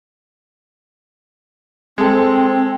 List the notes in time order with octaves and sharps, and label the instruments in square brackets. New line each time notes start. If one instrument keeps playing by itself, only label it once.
[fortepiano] G#3 A4 [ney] C4